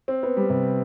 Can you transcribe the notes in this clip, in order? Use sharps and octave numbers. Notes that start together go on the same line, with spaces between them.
C4
B3
G3
C3